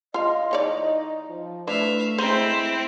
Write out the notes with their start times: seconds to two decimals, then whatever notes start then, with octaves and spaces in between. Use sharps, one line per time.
0.14 F4 D#5 F5
0.51 E3 D#4 C#5 D5
1.29 F3
1.67 A3 D4 E4 B4 E5 F5
2.18 G#3 C4 E4 C5